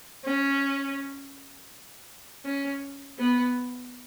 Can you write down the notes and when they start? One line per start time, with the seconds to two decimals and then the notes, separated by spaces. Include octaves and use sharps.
0.24 C#4
2.45 C#4
3.18 B3